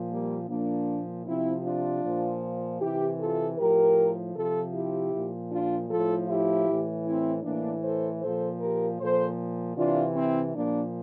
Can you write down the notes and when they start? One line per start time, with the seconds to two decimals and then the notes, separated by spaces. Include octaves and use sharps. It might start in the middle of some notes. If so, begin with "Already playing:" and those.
Already playing: A#2 F3
0.10 G3 A#3
0.48 A#2 F3 A#3 D4
1.26 C3 F3 C4 E4
1.64 D4 F4
2.03 A#2 F3
2.80 C3 E3 E4 G4
3.18 F4 A4
3.58 A2 F3 G4 A#4
4.34 C3 F3 F4 A4
4.73 E4 G4
5.13 A#2 F3
5.50 D4 F4
5.89 A2 F3 F4 A4
6.29 E4 G4
6.67 A2 E3
7.06 C4 E4
7.44 A2 E3 A#3 D4
7.82 A4 C5
8.21 A#2 F3 A4 C5
8.60 G4 A#4
8.99 A#2 F3 A4 C5
9.76 C3 E3 D4 F4
10.14 C4 E4
10.53 A#2 F3 A#3 D4